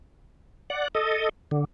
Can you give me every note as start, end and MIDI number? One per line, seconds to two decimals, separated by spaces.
0.70 0.88 74
0.70 0.88 78
0.95 1.29 69
0.95 1.29 75
1.51 1.65 50